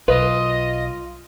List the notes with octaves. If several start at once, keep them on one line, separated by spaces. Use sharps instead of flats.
B1 F4 B4 D#5